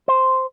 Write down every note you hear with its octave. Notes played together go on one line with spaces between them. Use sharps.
C5